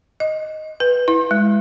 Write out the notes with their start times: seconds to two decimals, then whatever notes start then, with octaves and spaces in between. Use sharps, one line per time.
0.20 D#5
0.80 B4
1.08 E4
1.31 G#3